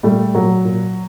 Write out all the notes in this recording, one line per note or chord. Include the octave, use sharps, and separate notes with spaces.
A#2 G3 A3
A#2 F#3
A#2